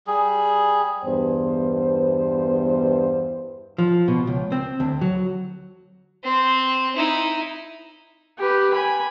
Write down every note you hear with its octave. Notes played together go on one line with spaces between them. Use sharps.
G3 G#4
E2 G2 B3 C5
F3
B2
C#2
C4
D2
F#3
C4
D#4 E4
G4 B4
G#5 B5